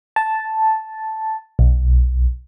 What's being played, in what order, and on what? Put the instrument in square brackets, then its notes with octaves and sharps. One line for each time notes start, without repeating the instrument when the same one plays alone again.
[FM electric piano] A5
B1